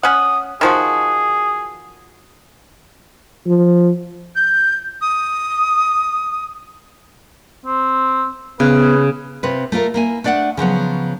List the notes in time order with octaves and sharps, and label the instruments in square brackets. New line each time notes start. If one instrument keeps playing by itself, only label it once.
[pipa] C#4 F#5 [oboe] D#6
[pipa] D#3 F3 F#4 [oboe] G#4
[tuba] F3
[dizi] G6
D#6
[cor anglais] C4
[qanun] C#3 [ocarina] B3 [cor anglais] B4
[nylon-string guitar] C3 C4 F4 B4
A3 F4 A#4
A#3 E4 G#5
A3 D4 D5 F5 F#5
C#3 F3 F#3 B3